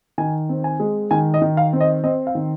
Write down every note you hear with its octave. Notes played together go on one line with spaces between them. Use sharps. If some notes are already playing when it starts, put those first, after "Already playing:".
D#3 G#5
C4
G#5
G#3
D#3 G#5
D#5
D#3
F5
C4
D#5
C4 D#5
F5
D#3